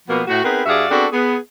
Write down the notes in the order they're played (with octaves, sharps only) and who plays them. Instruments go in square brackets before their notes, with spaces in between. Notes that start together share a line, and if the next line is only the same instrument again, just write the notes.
[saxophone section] B2 F3 A#3 B3
A2 F#4
B3 C4 D#4 G#4 A#4 B4
G2 F#4 G#4 D5 E5 F5
B3 C4 D4 F#4 G#4 A4
B3 G#4